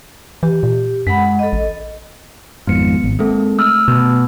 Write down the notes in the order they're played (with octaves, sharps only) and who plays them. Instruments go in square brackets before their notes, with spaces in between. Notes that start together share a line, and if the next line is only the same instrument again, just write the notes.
[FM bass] E3 [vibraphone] G4
[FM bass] A#2
[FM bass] F#2 [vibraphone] G#3 F#5 B5
[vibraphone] A4 D#5
[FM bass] A1
[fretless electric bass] G#1 F2 G#2 [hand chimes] B3 C#7
[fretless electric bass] G#1
[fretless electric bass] G#3 [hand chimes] A#3 C4 A4
[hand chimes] A3 E6 F6
[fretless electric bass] B2